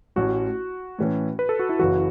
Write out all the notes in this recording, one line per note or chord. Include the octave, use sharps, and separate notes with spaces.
A1 A2 A3 C#4 F#4
A2 E3 C#4
B4
A4
F#4
E4
F#1 F#2 E3 F#4